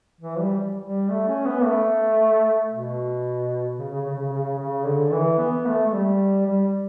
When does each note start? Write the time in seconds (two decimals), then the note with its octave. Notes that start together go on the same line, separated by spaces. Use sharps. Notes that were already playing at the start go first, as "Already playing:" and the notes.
0.21 E3
0.39 G3
0.83 G3
1.10 A3
1.28 C#4
1.46 B3
1.64 A3
2.71 B2
3.79 C#3
3.92 C#3
4.05 C#3
4.19 C#3
4.32 C#3
4.59 C#3
4.86 D3
5.12 E3
5.39 B3
5.66 A3
5.87 A3
5.93 G3
6.46 G3